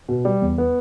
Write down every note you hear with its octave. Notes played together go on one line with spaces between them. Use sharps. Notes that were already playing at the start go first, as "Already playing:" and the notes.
B2
G3
E2
B3